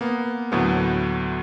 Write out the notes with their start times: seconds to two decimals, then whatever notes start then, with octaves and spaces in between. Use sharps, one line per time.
0.01 A#3 B3
0.52 D2 A2 F#3 A3 B3